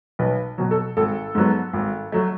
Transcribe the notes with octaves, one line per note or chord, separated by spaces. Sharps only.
B1 B4
B2 F#3
A4
G#1 A4
G#2 F#3 B3
G#1
F#3 A3